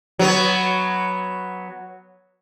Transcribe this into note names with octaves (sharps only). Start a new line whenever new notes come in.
F#3 B3